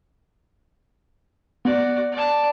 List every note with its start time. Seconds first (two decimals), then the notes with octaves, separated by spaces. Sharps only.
1.65 B3 F#4 D5
2.12 D5 A5